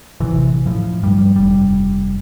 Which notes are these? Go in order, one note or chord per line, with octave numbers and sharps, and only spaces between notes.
A1 C3 E3
A2 F3
G2 G3
F1 G3